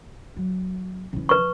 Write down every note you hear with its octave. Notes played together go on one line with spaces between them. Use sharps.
F#3
C#3 E3
B4 C#6